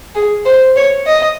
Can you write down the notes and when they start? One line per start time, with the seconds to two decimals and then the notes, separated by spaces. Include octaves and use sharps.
0.15 G#4
0.45 C5
0.76 C#5
1.06 D#5